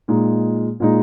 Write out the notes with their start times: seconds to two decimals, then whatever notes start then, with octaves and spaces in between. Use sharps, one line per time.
0.08 A#2 G#3 D#4
0.80 A#2 G#3 D#4